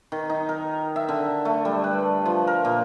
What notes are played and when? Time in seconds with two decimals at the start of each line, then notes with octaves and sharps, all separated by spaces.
0.12 D#3
0.30 D#4
0.49 A#4
0.96 E5
1.09 D3
1.45 A3
1.65 G3
1.84 B4
2.25 F3
2.47 A#4
2.65 A#2